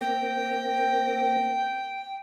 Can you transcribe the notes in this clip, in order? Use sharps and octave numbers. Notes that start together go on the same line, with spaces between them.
A#3 C4 G5 A#6